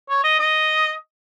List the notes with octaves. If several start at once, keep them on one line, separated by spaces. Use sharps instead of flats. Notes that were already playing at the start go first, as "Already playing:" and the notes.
C#5
D#5
D#5